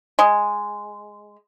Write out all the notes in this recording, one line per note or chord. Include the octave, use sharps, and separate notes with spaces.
G#3